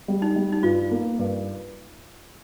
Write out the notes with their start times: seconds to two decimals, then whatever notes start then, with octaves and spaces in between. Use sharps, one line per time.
0.08 G3
0.22 D#4
0.36 G3
0.52 D#4
0.63 G2 F4
0.91 A#3
1.19 G2